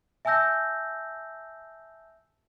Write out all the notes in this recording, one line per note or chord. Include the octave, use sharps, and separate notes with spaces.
E5 G#5 A5 E6 G6 A#6